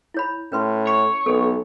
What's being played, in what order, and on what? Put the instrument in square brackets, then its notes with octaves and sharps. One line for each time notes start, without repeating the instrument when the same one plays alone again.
[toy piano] E4 C#5 B5
[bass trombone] A2 [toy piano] C#4 B4 C6
[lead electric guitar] C#5
[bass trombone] B1 [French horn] B3 [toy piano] A4